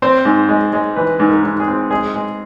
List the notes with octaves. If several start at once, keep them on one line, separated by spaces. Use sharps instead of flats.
C4 C5
G#2
G#3
G#3
E3 B4
G#2
A#4
G#2
G#4
C4
G#3 G#4
G#3